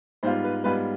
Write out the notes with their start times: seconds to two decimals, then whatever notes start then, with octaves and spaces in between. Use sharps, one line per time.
0.23 G#2 G3 B3 F4 C5
0.44 B4
0.64 G#2 G3 B3 F4 B4